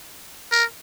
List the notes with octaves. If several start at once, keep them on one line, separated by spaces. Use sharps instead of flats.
A#4